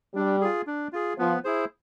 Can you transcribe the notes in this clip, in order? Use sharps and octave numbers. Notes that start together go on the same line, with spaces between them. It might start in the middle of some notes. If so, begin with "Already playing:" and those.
G3 D4
F4 G#4
D4
F4 G#4
F3 B3
E4 G#4 C5